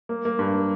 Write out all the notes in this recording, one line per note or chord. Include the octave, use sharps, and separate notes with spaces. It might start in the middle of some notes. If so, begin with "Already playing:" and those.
A#3
A#3
G2
A#3